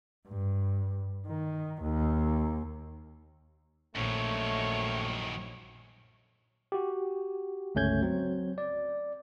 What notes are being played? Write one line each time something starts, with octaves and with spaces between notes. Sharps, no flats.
G2
D#3
D#2
A#1 F#2 D#3 A3 C#5
F#4 G4
G1 C#2 A3 C#4 G6 G#6
F#3 C4
D5